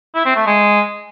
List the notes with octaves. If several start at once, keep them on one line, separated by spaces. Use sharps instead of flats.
E4
C4
A3
G#3